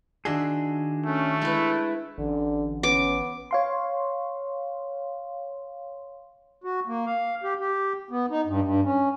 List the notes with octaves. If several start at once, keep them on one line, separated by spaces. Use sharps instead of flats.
D#3 D4 F#4 G#4 E5 C6
A3 C#4
G#3 E4 B4
A1 D3
B3 C#4 D6
C#5 F5 C6
F#4
A#3
F5
G4
G4
B3
D#4
G2
G2
C#4